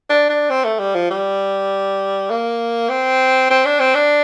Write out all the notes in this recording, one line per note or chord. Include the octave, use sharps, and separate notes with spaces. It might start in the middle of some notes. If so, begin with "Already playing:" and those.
D4
D4
C4
A3
G3
F3
G3
A#3
C4
C4
D4
C4
D4